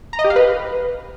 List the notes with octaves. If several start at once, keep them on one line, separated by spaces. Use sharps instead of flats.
A#5
D#5
G4
F5
B4